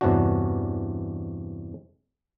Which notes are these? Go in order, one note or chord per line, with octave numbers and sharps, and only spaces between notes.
E2 G2 C3 C#4 D4 F#4